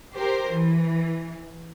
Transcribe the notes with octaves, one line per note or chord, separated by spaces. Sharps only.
G4 A#4 C5
E3